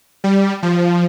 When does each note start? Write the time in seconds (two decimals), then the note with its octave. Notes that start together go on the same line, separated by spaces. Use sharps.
0.24 G3
0.63 F3